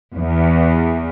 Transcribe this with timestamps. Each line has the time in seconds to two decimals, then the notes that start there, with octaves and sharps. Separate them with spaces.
0.16 E2